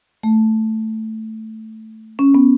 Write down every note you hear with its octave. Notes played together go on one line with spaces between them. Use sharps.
A3
C#4
B3